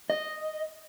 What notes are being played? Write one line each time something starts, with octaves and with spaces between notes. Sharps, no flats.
D#5